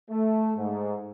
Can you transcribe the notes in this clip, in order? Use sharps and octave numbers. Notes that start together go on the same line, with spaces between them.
A3
G#2